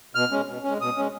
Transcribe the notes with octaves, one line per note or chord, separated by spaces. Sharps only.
B2 F6
G#3 C#4
B2
G#3 C#4
B2 D#6
G#3 C#4